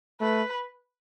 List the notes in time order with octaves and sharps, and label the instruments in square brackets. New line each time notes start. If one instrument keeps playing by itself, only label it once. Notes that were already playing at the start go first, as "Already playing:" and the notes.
[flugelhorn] A3 [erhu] B4